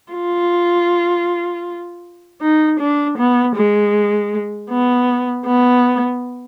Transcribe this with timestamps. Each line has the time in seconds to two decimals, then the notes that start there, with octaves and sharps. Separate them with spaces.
0.13 F4
2.42 D#4
2.80 D4
3.18 B3
3.56 G#3
4.70 B3
5.46 B3